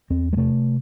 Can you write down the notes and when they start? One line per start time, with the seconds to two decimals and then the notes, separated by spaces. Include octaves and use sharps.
0.10 E2 C4
0.33 G#3
0.37 C3 A3